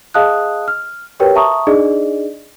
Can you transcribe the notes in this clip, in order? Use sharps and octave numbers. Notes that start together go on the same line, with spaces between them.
G#4 D#5 F5 A5 D#6 F#6
F6
F#4 G4 A#4 B4 C#5 G5
E5 A5 A#5 C#6 D#6
D4 D#4 G#4 D5 D#5